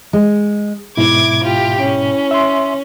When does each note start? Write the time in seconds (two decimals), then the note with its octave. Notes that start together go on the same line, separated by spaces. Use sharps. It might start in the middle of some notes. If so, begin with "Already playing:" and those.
0.13 G#3
0.97 G#2 B2 E4 D6 G#6
1.44 F4 G4
1.81 C#4
2.31 E5 C6